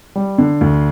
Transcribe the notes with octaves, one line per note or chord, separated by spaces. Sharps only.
G3
D3
D2